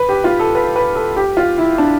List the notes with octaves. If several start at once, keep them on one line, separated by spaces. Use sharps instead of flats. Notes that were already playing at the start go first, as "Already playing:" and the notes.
Already playing: B4
G4
F4
A4
B4
B4
A4
G4
F4
E4
D4